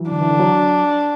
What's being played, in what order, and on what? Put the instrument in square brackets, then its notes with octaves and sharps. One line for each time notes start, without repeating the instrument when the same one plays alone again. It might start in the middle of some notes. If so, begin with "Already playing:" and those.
Already playing: [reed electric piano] E3 F#3
[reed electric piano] D3 [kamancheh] D4
[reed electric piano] E3
D3
F#3